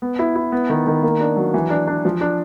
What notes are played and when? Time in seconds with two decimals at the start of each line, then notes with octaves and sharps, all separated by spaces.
0.02 B3
0.19 E4
0.36 E4
0.52 B3
0.70 D#3
0.87 D#3
1.03 A#3
1.21 D4
1.36 F#3
1.54 E3
1.70 D4
1.87 D4
2.05 F3
2.21 D4